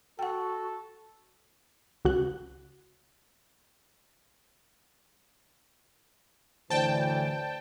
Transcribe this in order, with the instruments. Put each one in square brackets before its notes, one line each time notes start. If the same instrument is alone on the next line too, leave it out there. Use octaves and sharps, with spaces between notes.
[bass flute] F#4 [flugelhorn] A4 [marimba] F#5 G5
[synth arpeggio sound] C#2 F#4 F#6
[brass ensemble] D2 A2 E3 [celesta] C5 D5 [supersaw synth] G5 A5